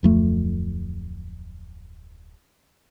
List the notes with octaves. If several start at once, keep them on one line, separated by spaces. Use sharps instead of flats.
D1 F2 A3